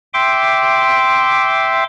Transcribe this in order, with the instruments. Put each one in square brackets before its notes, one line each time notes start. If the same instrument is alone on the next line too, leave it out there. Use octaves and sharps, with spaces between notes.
[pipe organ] E5 G5 C6 D6